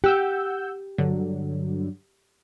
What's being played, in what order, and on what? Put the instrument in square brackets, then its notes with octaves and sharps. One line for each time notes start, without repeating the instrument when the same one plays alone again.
[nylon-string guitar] G4 [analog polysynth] F#5 E6 G6
[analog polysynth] G2 D3 F#3